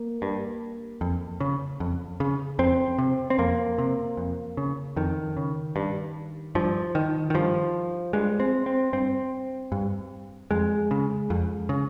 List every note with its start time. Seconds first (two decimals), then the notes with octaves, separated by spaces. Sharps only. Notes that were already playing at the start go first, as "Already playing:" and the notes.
Already playing: A#3
0.22 G2
1.01 F2
1.40 C#3
1.80 F2
2.20 C#3
2.59 F2 C4
2.98 C3
3.30 C4
3.39 F2 A#3
3.78 C3
4.17 F2
4.57 C#3
4.96 F2 D#3
5.37 C#3
5.76 G2
6.55 G2 F3
6.95 D#3
7.30 D#3
7.34 G2 F3
8.13 G2 G#3
8.40 C4
8.66 C4
8.93 G2 C4
9.72 G2
10.51 F2 G#3
10.91 C#3
11.30 F2
11.69 C#3